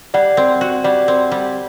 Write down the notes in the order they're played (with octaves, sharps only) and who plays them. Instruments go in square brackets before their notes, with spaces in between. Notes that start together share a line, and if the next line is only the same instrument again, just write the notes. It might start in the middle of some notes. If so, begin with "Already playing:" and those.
[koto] G3 [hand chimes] D5 F#5
[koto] C4
F#4
[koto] G3 [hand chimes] D5 F#5
[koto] C4
G3